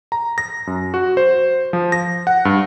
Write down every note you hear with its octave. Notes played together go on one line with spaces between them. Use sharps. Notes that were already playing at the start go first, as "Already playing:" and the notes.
A#5
A#6
F#2
F#4
C5
F3
A#6
F#5
G2